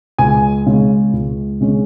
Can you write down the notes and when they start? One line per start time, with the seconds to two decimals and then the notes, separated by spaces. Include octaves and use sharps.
0.19 C#2 G#5
0.66 C#3 G#3 C#4
1.13 C#2
1.61 C#3 G#3 C#4